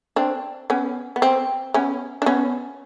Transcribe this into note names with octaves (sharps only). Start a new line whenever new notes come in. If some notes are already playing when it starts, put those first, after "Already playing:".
C4 D4
B3 C#4
B3
C4
B3 C#4
D4
B3 C#4